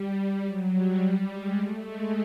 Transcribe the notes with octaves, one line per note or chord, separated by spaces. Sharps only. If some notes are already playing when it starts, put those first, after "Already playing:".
Already playing: G3
G3
F#3
G3
G#3
A3
G#3